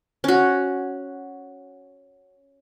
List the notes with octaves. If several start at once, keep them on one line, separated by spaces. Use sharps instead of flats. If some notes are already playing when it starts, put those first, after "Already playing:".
C#4 F#4